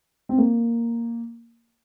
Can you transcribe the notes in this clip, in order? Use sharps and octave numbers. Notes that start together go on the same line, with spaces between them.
C4
A#3